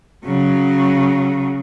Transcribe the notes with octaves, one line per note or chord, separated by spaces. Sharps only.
C#3 F#3